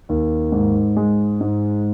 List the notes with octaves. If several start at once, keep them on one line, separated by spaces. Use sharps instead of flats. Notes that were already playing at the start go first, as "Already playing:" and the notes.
D#2
G#2
G#3
G#2